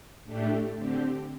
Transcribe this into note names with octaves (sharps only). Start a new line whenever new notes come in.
A2 A3 D4 G4
D3 C4 G4